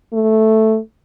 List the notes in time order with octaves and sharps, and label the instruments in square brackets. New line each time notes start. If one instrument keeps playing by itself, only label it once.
[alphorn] A3